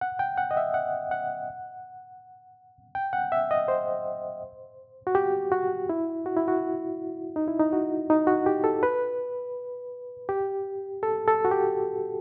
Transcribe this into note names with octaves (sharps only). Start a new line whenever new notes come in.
F#5
G5
F#5
D#5
E5
F#5
F#5
G5
F#5
E5
D#5
C5
F#4
G4
F#4
E4
F#4
E4
F#4
D#4
E4
D#4
F#4
D#4
F#4
G4
A4
B4
G4
A4
A4
F#4
G4